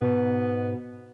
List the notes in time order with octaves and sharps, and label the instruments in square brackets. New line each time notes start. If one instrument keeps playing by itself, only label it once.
[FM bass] G#2 [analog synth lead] B2 [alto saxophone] B3